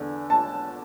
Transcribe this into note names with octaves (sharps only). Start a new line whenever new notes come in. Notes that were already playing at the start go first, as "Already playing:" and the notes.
Already playing: E2 D3
A5